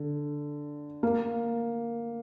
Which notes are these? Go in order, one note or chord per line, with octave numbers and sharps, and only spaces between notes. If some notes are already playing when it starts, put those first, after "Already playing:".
Already playing: D3
A#3